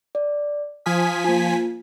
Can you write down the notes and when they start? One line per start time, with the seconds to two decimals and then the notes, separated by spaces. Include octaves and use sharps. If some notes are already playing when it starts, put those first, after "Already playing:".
0.15 D5
0.86 F3 G#5 D#6 F6 B6
1.24 A#3 F4